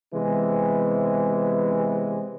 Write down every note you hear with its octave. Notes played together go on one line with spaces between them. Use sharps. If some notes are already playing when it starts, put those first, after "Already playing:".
C3 E3 G#3 B3 C4